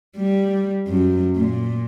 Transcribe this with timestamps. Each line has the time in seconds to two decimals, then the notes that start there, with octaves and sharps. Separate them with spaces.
0.17 G3
0.87 F#2
1.36 A#2